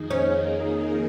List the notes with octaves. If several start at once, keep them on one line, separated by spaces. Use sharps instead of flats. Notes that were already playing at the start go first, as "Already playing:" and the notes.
Already playing: F2 D#3 A#3 D#4 G#4
C#4